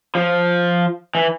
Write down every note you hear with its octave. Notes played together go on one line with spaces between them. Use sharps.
F3
E3